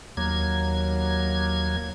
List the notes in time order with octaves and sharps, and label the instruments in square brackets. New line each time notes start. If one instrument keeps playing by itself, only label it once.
[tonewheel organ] D#2 F#3 A#3 G#6